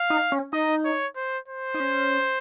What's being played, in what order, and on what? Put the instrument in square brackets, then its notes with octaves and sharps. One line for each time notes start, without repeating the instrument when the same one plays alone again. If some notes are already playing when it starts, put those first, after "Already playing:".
Already playing: [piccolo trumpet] F5
[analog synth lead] D#4
C#4
[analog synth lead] D#4 [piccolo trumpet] D#5
[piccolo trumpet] C#5
C5
C5
[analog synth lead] D#4
C#4